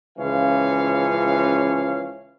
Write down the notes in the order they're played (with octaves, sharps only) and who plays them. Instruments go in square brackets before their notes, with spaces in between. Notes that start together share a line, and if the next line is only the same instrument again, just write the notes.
[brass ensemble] C#2 E3 F3 C#4 C#5 F5